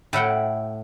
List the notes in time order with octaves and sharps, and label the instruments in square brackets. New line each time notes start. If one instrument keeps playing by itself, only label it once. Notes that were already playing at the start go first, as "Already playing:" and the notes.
[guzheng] A2 E4 F#5 G5